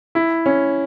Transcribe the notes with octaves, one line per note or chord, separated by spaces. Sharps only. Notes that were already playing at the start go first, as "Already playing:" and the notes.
E4
C#4